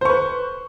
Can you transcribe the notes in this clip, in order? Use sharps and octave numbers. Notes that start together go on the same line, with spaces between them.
B4 C5 C#6